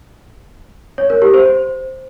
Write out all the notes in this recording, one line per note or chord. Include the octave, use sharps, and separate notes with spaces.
C#5
A#4
G4
C5
C5